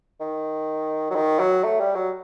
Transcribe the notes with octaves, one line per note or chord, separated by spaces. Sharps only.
D#3
F#3
D#3
F#3
A3
G3
F#3